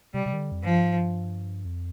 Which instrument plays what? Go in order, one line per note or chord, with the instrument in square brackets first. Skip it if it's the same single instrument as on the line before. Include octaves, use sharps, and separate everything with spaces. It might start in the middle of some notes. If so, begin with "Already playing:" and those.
[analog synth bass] C3 [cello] G3
[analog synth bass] C3
D#3
D3
F2
[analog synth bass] G2 [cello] F3
[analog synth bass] G#2
G2
F2